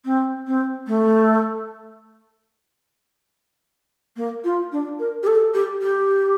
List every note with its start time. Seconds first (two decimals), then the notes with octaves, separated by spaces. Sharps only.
0.05 C4
0.47 C4
0.87 A3
4.16 A#3
4.44 F4
4.72 D4
4.99 A#4
5.23 G4
5.27 A4
5.54 G4
5.81 G4